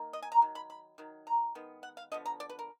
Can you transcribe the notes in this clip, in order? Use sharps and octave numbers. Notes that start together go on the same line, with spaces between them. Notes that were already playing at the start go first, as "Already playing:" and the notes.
Already playing: D#3 A#3
D#5
G#5
A#5
D#3 F#3
B5
B5
D#3 F#3
A#5
D#3 G#3 B3
F#5
F5
D3 F3 B3 D#5
A#5
D5
B4
A#4